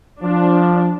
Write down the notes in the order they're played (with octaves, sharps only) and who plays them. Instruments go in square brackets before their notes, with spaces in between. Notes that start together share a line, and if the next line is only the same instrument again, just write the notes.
[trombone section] F3 [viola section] D4